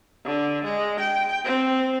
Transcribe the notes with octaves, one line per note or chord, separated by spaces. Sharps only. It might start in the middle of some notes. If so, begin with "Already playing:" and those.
D3
G#3
G5
C4